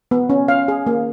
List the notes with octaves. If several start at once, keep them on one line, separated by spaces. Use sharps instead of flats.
B3
C#4
F5
G#4
A#3